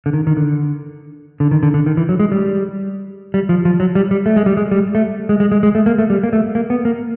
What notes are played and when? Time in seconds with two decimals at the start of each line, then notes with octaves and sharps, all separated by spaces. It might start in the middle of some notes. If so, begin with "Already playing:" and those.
0.06 D3
0.13 D#3
0.27 D#3
0.37 D3
1.40 D3
1.51 D#3
1.63 D3
1.74 D3
1.86 D#3
1.97 E3
2.09 F#3
2.20 G#3
2.32 G3
3.34 G3
3.49 F3
3.65 F3
3.80 F#3
3.95 G3
4.11 G3
4.26 A3
4.36 G#3
4.46 G3
4.57 G#3
4.71 G3
4.95 A3
5.29 G#3
5.40 G#3
5.52 G#3
5.63 G#3
5.75 A3
5.86 A#3
5.99 A3
6.10 G3
6.24 A#3
6.33 A3
6.55 A#3
6.70 B3
6.85 A#3